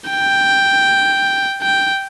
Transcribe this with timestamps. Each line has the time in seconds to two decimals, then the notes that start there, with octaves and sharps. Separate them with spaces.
0.10 G5
1.62 G5